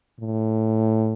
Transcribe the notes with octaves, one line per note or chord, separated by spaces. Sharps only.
A2